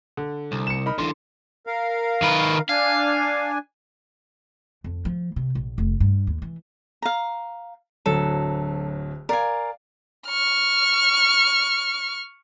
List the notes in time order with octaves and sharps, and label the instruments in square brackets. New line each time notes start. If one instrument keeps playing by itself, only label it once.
[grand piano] D3
[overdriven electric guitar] C2
[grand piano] C#7 E7
D#4 A#4 B5
[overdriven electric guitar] D3 E3 [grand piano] C6
[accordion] A#4 F5
[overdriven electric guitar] D#3 B4
[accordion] D4 G#5 [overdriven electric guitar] F5
[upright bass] F2
F3
C3
A#1
F1
G2
D#2
E3
[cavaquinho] F5 A#5
[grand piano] D1 D2 F#3 [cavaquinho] A4
[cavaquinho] A#4 G#5 [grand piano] D5 F5
[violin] C#6 F6